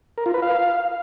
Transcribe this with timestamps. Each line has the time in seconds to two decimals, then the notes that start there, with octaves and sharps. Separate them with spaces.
0.18 A#4
0.26 F4
0.34 B4
0.42 F5